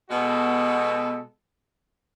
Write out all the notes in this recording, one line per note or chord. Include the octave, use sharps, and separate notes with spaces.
B2 G#3 B3 F#4 A4